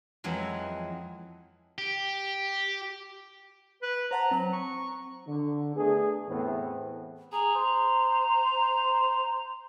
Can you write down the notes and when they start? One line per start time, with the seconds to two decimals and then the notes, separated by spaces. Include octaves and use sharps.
0.24 F2 E3 F#3 G#3
1.78 G4
3.82 B4
4.11 C5 F#5 A5 A#5
4.31 F#3 C4 A#5
4.53 C#6
5.27 D3
5.75 A3 B3 D4 G#4
6.28 E2 A2 E3 A3 B3 C4
7.32 G#4 A#5
7.55 C5